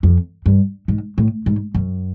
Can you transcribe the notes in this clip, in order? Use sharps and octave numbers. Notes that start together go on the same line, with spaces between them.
F2
G2
G#2
A2
G#2
F#2